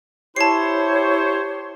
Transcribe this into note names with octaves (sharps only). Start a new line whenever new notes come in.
E4 G4 C5 C#5 A5 C7